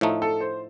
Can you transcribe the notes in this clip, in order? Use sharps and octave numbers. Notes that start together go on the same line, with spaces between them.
A2 F3 A3 D#4
A4
C5